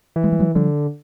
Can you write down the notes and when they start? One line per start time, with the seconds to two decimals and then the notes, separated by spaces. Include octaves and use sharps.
0.16 E3
0.24 G#3
0.32 G3
0.39 F#3 G#3
0.55 D3 F3 G3